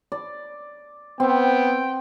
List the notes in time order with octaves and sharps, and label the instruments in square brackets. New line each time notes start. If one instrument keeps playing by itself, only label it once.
[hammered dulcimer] D5
[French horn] B3 [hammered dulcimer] C4 [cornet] G5